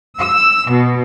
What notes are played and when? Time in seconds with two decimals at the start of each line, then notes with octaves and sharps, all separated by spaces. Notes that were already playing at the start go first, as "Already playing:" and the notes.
0.18 E6
0.71 B2